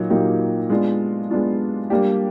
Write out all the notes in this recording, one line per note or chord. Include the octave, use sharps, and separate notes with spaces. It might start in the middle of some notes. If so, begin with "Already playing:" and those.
Already playing: A#2 F#3 A#3 D#4
A#2 F#3 A#3 D#4 G4
G#3 B3 D4 F4
G#3 B3 D4 F4
G3 A#3 D4 G4